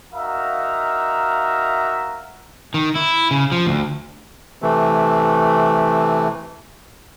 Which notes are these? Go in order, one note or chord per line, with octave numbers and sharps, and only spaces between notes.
D#4 F#4 A#4 E5 F5 A#5
D#3
E4
C#3
F3
D2
C3 E3 A3